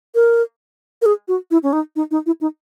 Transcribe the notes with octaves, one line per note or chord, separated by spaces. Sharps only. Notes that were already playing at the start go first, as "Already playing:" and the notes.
A#4
A#4
G#4
F#4
E4
C#4
D#4
D#4
D#4
E4
D#4